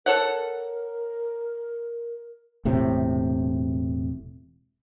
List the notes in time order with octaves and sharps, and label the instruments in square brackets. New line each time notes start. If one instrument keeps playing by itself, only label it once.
[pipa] A4 C#5 F#5 [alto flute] A#4
[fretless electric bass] E1 A2 C3